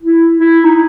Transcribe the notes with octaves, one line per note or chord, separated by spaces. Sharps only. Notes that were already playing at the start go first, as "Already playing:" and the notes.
E4
E4
D#4